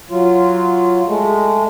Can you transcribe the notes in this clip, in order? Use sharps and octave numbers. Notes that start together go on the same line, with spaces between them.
F#3 F4
G#3 A3